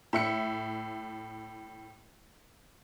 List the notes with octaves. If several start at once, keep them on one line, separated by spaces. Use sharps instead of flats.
A2 E5 C#7